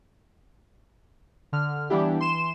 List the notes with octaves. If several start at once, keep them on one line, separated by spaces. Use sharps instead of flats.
D3 F6
E3 G3 B3 D4 E4 G4
E3 C6 E7